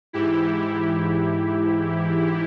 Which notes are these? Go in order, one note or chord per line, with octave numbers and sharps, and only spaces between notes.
G#2 E3 E4 G4